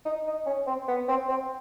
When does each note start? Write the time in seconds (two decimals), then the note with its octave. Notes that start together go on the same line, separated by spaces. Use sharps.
0.05 D#4
0.27 D#4
0.46 C#4
0.67 C4
0.88 B3
1.09 C4
1.29 C4